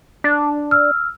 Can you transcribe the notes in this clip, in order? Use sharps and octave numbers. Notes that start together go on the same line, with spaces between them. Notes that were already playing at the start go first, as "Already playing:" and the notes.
D4
E6 F6